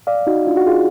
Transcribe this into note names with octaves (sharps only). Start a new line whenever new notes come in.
D5 F5
D#4 F#4
D4 F4
F#4
F4 G#4